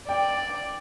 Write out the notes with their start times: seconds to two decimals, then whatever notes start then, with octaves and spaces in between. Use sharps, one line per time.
0.08 D5 G5